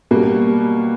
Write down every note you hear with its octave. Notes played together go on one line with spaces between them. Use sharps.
B2 G3 A#3